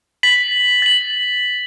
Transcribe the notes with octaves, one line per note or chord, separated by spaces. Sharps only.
A6 B6 F#7
A6 F#7